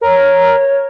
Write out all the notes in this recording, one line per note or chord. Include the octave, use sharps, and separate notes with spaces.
A#4 C#5